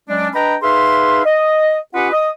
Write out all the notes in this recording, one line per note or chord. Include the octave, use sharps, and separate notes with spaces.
F#3 G#3 C#4 D4
D4 B4 D#5 G5 A#5 B5
D#4 G#4 B4 E5 F5 C6
D#5
C#4 F4 G4 B4 D#5 F#5
D#5 D#6